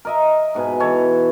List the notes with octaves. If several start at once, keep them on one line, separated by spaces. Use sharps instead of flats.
A#4 D#5 E5
G#2 B2 B4 G#5
E3 A4 C#5